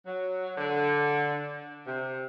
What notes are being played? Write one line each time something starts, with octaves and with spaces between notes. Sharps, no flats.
F#3
D3
C3